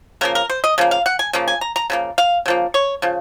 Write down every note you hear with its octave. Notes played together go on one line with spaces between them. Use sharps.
C#3 F3 A#3 A#4
A#4
C5
D#5
C#3 F3 A#3
F5
F#5
G#5
C#3 F3 A#3
G#5
A#5
A#5
C#3 F3 A#3
F5
C#3 F3 A#3
C#5
C#3 F3